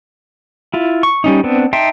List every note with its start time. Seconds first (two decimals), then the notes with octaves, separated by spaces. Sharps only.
0.74 E4 F4
1.03 C#6
1.24 G3 C#4 D#4
1.44 B3 C4 D4
1.73 D#4 E5 G5 A5 C6